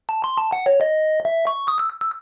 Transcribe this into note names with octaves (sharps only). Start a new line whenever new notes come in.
A5
C6
A5
F#5
C#5
D#5
E5
C#6
D#6
E6
E6